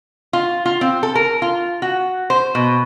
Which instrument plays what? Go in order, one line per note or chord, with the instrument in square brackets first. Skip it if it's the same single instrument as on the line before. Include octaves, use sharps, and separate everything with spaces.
[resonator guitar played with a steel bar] F4
F4
C4
A4
A#4
F4
F#4
C5
B2